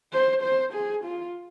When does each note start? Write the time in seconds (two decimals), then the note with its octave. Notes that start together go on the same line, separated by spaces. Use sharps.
0.12 C5
0.43 C5
0.73 G#4
1.04 F4